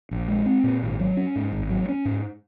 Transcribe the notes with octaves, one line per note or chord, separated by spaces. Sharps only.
A#1
G#3
C4
A#2
G#1
F#3
C#4
G#2
G#1
F#3
C#4
G#2